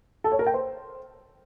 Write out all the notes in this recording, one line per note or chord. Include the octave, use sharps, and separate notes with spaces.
A4
C#5
A#4
G5
C5